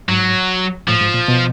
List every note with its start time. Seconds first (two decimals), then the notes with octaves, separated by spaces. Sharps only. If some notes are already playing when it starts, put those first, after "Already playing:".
0.09 G#2 F#3
0.88 A2 F3
1.01 G#2
1.14 A#2
1.28 B2